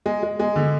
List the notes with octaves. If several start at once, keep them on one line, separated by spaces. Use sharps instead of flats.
G#3
G#3
G#3
D3